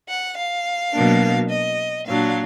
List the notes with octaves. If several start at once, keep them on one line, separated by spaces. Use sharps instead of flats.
F#5
F5
B2 F#3 A#3 D4
D#5
A#2 F#3 D4 F5